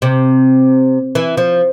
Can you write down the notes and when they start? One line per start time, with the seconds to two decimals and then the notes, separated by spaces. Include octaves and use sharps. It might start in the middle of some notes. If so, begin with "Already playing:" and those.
0.02 C3
1.15 E3
1.37 F3